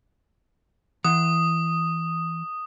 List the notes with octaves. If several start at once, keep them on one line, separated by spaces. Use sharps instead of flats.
E3 F#5 D#6